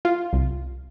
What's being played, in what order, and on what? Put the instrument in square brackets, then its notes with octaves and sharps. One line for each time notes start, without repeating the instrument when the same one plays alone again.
[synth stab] F4
C2